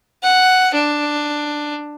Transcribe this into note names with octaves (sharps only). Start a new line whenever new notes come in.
F#5
D4